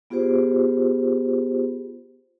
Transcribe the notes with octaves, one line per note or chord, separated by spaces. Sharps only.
B3 F4 G4 G#4 C5